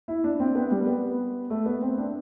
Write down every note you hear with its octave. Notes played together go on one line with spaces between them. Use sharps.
E4
D4
C4
B3
G3
B3
A3
B3
C4
D4